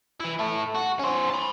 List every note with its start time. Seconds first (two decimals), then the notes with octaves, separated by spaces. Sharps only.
0.20 E3 E4
0.39 E4 A4
0.75 F#4
1.00 C#4 C5
1.30 A5 B5